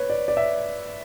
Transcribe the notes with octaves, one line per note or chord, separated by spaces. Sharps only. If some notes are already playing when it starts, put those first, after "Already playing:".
Already playing: B4 C#5
D5
D5
E5